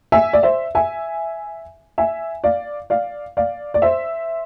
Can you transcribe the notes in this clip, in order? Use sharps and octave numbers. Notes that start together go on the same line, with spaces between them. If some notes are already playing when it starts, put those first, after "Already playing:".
E5 G#5
D5
C5 E5
E5 G#5
E5 G#5
D5 F5
D5 F5
D5 F5
D5
C5 E5